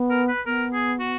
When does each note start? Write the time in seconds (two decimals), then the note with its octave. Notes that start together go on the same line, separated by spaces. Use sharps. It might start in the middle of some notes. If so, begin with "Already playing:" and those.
Already playing: B3
0.10 A#4
0.28 B4
0.46 B3 A#4
0.74 G#4
0.99 F#4